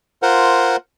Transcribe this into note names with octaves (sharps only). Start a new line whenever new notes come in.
F4 A#4 C5 F#5